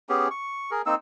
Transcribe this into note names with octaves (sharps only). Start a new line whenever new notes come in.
B3 C#4 G4 G#4
C#6
G#4 A#4
A#3 C4 D#4 E6